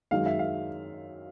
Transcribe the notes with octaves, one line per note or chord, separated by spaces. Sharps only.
F#2 D#3 G#3 F5
E5
F5